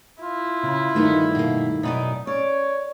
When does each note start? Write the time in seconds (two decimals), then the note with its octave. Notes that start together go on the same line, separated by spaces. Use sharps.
0.22 E4 F4
0.63 C#3
0.95 D2 G2 D#3 A3 B3 D#4
1.35 B2 A#3
1.83 F#2 B2 B3 D#4 D5
2.27 C#4 C#5 D5